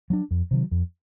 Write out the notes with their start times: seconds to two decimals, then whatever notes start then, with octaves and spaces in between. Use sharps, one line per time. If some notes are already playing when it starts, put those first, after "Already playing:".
0.10 F#3 B3 D4
0.31 F2
0.51 C3 D#3 F#3
0.71 F2